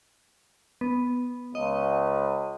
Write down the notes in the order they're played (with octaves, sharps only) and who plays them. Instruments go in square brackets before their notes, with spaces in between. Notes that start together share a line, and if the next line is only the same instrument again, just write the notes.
[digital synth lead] B3
[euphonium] C#2 [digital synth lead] D#5